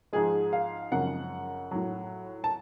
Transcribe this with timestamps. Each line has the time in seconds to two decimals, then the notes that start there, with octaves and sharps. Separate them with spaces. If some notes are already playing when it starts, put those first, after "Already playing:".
0.13 G#2 F3 G#3 G#4
0.53 F5
0.92 F#2 C#3 F3 G#3 F#5
1.71 A2 F#3
2.44 A5